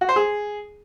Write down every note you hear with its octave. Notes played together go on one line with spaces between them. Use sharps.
F#4
C5
G#4